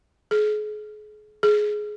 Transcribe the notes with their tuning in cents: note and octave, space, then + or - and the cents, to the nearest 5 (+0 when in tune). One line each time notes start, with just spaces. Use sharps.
G#4 +35
G#4 +15